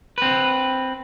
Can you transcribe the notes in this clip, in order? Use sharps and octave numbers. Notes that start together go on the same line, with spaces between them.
C4 B4